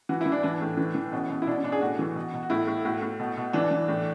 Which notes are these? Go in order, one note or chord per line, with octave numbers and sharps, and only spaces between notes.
E3 F#4
E4
E3
D4
E3 D4
A2
E3
E3
B2 C#4
B2
E4
B2 D4
C#4
B2 D4
G#4
A2 F#4
E3
B2
B2
F#4
A2 E4
A2
A2 F#4
A2
B2
B2
E3 D4
E3
A2